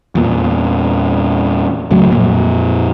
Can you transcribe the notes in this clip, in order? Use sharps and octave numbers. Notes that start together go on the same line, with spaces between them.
E2 A#2
C#2 A2 F#3
F2 A#2